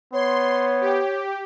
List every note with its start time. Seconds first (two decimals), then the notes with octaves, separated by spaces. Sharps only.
0.13 B3 C#5 C6
0.81 G4